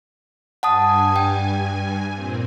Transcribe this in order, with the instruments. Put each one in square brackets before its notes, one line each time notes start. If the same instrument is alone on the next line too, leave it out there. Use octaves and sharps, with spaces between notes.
[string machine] G2 G#5 [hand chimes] F#5 A5 D#6
[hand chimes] G5
[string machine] A#2 C4